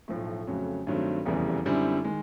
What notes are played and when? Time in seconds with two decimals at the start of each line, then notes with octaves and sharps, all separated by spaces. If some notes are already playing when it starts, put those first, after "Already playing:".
0.08 B1 A2 F3 A3
0.47 F2 C#3 F#3 A3
0.87 G2 D#3 F#3 A3 C4
1.25 F1 E2 C#3 E3 G3
1.65 F#2 D3 G3 C4 E4
2.04 D#3 G#3